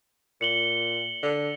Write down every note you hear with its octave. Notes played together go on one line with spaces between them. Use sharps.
A#2 C#7 F#7 G7
D3